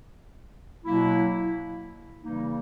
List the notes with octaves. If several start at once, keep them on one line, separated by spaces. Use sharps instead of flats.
B2 F#3 A#3 E4
C#3 E3 G3 A#3 D#4